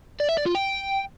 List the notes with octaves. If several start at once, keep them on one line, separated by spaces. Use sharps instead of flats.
D5
E5
D5
F4
G5